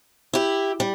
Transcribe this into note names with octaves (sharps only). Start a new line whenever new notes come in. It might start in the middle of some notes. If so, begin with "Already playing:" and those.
E4 G4
G3